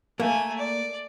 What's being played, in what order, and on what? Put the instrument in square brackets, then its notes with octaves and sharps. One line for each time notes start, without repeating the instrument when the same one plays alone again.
[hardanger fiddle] A3 G#5 [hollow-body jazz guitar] A#3
[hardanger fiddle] D5